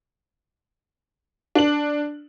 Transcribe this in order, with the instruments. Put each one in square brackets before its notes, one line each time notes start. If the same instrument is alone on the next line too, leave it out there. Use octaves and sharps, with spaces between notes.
[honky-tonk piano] D4 F#7